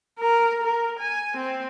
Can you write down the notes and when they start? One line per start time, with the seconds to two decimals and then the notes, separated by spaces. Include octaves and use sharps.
0.19 A#4
0.63 A#4
0.99 G#5
1.37 C4